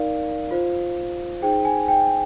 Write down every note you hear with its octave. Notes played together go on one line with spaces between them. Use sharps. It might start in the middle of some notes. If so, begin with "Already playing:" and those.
Already playing: D#4 A#4 D5 F5
F4 C5
D#4 G#4 C5 G5
G#5
G5